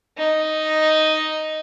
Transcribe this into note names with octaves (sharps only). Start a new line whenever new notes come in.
D#4